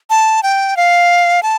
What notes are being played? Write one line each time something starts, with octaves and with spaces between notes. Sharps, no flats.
A5
G5
F5
A5